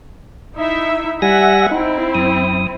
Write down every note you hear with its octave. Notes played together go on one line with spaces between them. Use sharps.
D#4 E4 E5
G3 E5 F#5 G#5 A#6
C4 D#4 E4
F#2 D#6